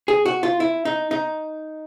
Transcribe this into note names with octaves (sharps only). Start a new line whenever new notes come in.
G#4
F#4
F4
E4
D#4
D#4